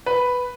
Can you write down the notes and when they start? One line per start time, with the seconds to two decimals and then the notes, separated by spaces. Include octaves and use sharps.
0.06 B4